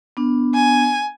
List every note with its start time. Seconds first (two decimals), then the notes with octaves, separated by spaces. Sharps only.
0.17 B3 D4
0.54 G#5